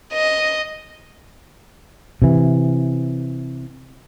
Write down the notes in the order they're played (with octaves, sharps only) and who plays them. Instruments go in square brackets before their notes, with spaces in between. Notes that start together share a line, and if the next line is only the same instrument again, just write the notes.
[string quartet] D#5
[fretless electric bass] C3 E3